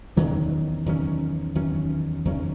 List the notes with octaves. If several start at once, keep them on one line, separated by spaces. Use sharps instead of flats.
E2 D#3 F#3 C#4
E2 D#3 F#3 C#4
E2 D#3 F#3 C#4
E2 D#3 F#3 C#4